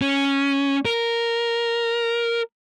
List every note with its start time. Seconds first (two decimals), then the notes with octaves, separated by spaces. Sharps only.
0.01 C#4
0.85 A#4